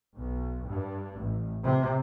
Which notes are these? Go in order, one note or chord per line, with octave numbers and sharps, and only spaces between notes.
B1
G2
A1
C3